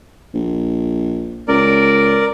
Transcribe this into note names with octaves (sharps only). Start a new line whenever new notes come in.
A#1
C#2 A#4 D5